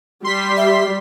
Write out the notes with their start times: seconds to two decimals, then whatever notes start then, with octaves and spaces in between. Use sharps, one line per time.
0.24 G3 C6 B6
0.57 E5